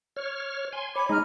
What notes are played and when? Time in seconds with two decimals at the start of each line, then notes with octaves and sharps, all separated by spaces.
0.16 C#5 F6
0.73 G#5 C6
0.95 C#5 G#5 B5 D6
1.09 G#3 D#4 G#5 A#5 F6